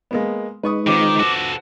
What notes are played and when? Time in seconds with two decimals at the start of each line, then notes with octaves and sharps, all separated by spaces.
0.11 G#3 A#3 B3
0.63 G#3 D#4 B4 C#6 D#6
0.87 D#3 C4 F4 B4 D6
1.20 F#4 A4